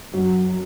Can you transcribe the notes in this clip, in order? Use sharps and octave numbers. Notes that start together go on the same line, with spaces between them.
F#2 F#3